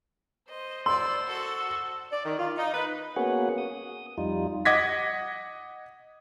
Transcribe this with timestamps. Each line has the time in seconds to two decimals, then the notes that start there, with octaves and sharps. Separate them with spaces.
0.48 C5 D#5
0.86 D5 C6 E6
1.26 F#4 A4
2.12 D5
2.25 D#3
2.39 F4
2.57 D#4
2.73 B4
3.16 A#3 B3 C#4 F#4 G#4 F#5
3.58 D#6
4.18 F2 G3 D#4 F4
4.65 D#5 F#5 D6 G#6 A#6 B6